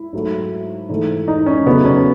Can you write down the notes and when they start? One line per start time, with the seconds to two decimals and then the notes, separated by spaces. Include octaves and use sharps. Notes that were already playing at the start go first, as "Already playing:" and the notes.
Already playing: E4
0.13 G#2 F#3 A3
0.89 G#2 E3 A3
1.28 D#4
1.46 C#4
1.66 E2 C#3 F#3 A3 B3
1.85 C#4